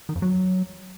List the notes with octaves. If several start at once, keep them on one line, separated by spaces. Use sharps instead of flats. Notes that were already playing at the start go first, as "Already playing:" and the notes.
D#3
F2
F#3